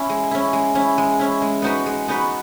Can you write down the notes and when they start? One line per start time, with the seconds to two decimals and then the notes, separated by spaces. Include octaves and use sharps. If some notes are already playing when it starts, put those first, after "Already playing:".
Already playing: C#4 E4
0.09 G#3
0.31 C#4 E4
0.53 G#3
0.75 C#4 E4
0.98 G#3
1.20 C#4 E4
1.42 G#3
1.62 B3 D#4 F#4 B4
1.86 G#3
2.08 B3 D#4 F#4 B4